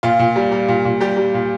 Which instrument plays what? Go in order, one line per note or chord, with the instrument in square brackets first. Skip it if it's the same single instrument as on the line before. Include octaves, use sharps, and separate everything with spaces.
[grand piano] A#2 F4
A#2
G3
G3
A#2
A#2
G3 G4
G3
A#2